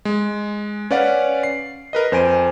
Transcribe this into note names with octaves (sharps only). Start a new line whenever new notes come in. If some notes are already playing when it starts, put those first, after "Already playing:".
G#3
C#4 B4 D5 F5 F#5
C7
A#4 B4 D#5
F2 C5 G#5 D7 D#7